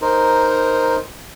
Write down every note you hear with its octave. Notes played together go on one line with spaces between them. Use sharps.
D#4 A#4 C5